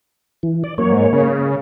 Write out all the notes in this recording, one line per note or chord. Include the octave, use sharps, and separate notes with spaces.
E3
D5
F#2 A#3 C#5
G#2
C#3